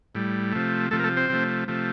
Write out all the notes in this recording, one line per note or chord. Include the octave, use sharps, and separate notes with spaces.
A2 G3
C3 F3 A3
C3 F3 A3 A4
A#4
A3 A4
C4 C5
C3 F3 A3
C3 F3 A3